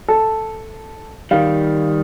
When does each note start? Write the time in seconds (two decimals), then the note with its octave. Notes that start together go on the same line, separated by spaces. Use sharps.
0.08 A4
1.31 D#3 G3 F5